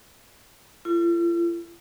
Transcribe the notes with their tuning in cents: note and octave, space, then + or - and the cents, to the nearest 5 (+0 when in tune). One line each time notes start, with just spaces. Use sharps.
F4 -45 A4 +25